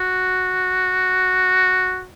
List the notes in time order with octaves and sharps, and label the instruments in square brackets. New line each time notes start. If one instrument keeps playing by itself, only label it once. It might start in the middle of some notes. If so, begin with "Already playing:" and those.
Already playing: [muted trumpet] F#4